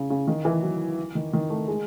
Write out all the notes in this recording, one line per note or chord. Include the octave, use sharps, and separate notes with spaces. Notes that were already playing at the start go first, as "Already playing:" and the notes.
Already playing: C#3
C#3
D#3
E3
F#3
D#3
D#3
A3
G#3